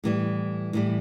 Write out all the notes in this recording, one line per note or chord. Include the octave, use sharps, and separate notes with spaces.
A2 E3 G3
A2 E3 G3